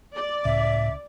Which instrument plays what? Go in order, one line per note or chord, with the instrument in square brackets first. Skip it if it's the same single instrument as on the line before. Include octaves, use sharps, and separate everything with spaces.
[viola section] D5
[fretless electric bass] C#2 [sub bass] A2 [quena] E5